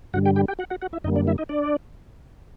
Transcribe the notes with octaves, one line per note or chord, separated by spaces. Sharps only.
G2 D3 G3 F#4 F#5
G4 G5
G4 G5
G4 G5
F#4 F#5
F#4 F#5
F#4 F#5
E4 E5
F#2 D3 G3 A#3 D#4 D#5
D4 D5
E4 E5
D#4 D#5
D4 D5